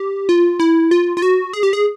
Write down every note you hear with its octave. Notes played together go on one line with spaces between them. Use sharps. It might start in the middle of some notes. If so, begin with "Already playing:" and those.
Already playing: G4
F4
E4
F4
F4
F#4
G#4
G4
G#4